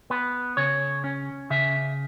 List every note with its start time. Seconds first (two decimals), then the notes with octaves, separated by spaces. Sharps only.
0.10 B3 B4
0.57 C#3 C#5
1.04 C#4
1.50 C#3 E5